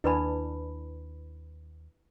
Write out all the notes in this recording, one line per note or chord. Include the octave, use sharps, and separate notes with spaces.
D#2 D4 E4 B4 G#5 B5